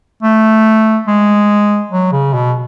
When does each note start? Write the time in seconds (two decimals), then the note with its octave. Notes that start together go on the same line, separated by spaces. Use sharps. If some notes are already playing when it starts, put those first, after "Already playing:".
0.23 A3
1.07 G#3
1.91 F#3
2.12 C#3
2.34 B2